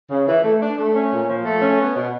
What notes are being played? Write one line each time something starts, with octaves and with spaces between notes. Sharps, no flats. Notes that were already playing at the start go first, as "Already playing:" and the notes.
C#3
E3
A3
D4
A3
C#4
A#2
F3
A3
C#4
B3
B2